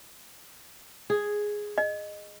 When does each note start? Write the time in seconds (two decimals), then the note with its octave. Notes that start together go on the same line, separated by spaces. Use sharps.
1.10 G#4
1.78 D#5